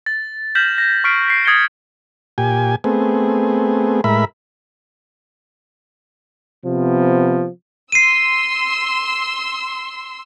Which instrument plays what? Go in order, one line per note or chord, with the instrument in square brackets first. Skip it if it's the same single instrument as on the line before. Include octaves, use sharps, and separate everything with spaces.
[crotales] A6
F6 G6 A#6 B6 E7 F#7
A#6
C#6 F6 B6 C7 D7
B6 C7
D#6 G#6 A6 C7 C#7 G7
[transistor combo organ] A#2 G4 G#5
A3 B3 C4 G#4
A2 G#3 A#4 E5 B5
[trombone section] C3 F3 B3
[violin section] C6 E6 [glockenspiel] C7 D#7